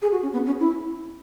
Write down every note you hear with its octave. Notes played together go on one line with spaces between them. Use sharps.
G#4
F#4
C#4
B3
C#4
E4